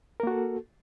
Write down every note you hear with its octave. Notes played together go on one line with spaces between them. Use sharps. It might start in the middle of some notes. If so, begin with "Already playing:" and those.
A#3 F#4 A4 A#4